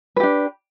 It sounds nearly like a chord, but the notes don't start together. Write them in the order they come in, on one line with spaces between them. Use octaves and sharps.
B4 G4 D4